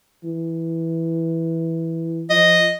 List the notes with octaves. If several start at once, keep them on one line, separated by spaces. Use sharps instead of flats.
E3
F3 D#5